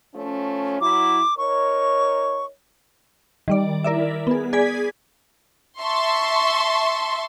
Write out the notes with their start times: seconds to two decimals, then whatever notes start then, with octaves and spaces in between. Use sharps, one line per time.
0.14 F3 A3 C#4
0.81 F#3 E4 D6
1.38 D#4 A#4 C#5 C#6
3.48 D#3 G3 D5
3.84 E4 A#4 D5 E5
4.27 B3 G#4
4.53 G#4 D5 G#5 G#6 B6
5.79 E5 A5 C6 C#6